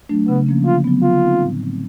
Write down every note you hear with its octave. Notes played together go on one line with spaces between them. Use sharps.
F#3 A3 D4
C#3 B3
F3 A#3 C#4
D3 F4
F#3 B3
D3 F4
G3 C4 D#4
A2
F#3 A3 C4